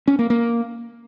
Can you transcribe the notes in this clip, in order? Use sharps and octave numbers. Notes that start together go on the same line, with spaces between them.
C#4
A#3
A#3